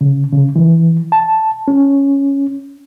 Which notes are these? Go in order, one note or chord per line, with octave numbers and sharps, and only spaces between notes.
C#3
C#3
E3
A5
C#4